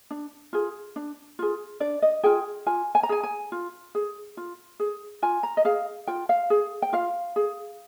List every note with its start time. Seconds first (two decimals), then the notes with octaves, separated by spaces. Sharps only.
0.11 D4
0.53 F4 G#4
0.96 D4
1.39 F4 G#4
1.80 D4 D5
2.02 D#5
2.23 F4 G#4 G5
2.66 F4 G#5
2.95 G#5
3.03 A#5
3.09 G#4 G#5
3.23 G#5
3.52 F4
3.95 G#4
4.37 F4
4.80 G#4
5.22 F4 G#5
5.43 A#5
5.57 D#5
5.65 G#4 F5
6.07 F4 G5
6.29 F5
6.50 G#4
6.82 G5
6.93 F4 F5
7.36 G#4